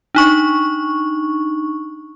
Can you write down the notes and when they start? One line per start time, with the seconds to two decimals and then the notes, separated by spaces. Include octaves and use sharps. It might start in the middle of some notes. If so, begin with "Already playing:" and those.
0.15 D4 D#4 C#6